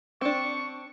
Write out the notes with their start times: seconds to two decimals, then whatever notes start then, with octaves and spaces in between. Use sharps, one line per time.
0.21 C4 D4 C#6